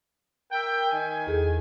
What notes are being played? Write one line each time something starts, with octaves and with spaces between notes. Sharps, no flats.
A#4 E5 G5
D#3 G#5
E2 G#4 A4